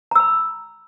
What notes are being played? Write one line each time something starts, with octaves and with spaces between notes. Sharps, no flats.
A#5 B5 E6